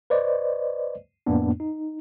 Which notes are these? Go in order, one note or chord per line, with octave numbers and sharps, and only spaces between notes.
B4 C5 D5 D#5
F2 A2 A#3 B3 D4
D#4